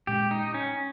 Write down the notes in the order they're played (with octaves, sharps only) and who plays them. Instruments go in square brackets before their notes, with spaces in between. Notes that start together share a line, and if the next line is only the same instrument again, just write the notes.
[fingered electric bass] A#2 G#3 C#4 [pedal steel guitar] G4
[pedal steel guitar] D#4
C#4